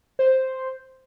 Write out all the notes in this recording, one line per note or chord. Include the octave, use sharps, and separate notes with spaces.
C5